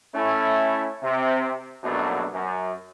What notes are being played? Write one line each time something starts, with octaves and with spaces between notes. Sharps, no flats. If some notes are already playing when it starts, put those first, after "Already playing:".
A3 C#4 E4
C3
A#1 F#2 B2 F#3 A3 D4
F#2